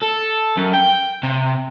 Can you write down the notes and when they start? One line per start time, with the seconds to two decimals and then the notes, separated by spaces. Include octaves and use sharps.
0.02 A4
0.57 F#2
0.73 G5
1.23 C3